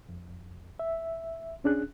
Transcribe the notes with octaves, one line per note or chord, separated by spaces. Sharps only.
F2
E5
D#2 C#4 D4 G#4 F#6